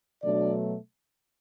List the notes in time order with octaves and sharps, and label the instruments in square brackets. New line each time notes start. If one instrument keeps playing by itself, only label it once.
[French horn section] B2 F#3 A3 D4 D5